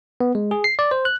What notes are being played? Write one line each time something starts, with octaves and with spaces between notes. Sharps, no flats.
B3
G#3
G#4
C7
D5
C5
F#6